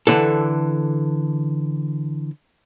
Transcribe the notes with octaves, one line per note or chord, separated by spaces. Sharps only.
D3 E3 A4